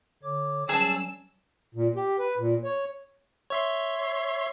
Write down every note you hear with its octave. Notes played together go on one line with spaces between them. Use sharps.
D3 C#5 D6
F#3 G3 C#4 G#4 A5 E6
A#2
G4
B4
A#2
C#5
C#5 E5 C6